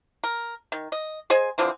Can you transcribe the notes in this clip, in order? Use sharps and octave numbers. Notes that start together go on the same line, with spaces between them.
A#4
D#3
D#5
G#4 C5 D#5 G#5
D3 E3 F3 C4